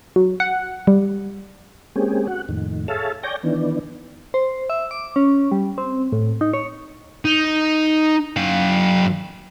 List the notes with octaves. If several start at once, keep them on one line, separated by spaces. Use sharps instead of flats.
F#3
F#5
G3
G#3 A#3 C4 C#4 G4 G#4
F#4 F#5
F2 A2 D#3
G#4 A4 C#5 E5 F5 A5
C#5 D5 G5 G#5 G6 A#6
D#3 E3 B3 D4
C5
E5
D6
C#4
G3
C4
A2
D#4
C#5
D#4
F#2 F5